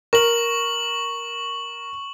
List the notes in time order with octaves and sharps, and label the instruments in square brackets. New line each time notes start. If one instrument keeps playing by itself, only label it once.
[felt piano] A#4 [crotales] C#6 F#7